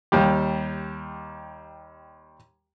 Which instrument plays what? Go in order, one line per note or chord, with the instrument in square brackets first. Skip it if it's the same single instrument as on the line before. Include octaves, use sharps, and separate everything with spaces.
[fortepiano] D#2 G3 G4